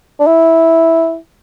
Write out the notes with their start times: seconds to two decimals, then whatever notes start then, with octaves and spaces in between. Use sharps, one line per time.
0.20 D4
0.27 E4